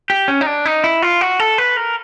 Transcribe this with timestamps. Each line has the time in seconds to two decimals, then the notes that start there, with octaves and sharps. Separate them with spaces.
0.10 G4
0.28 C#4
0.41 D#4
0.46 D4
0.65 D#4
0.84 E4
1.02 F4
1.21 F#4
1.40 A4
1.58 B4
1.77 A#4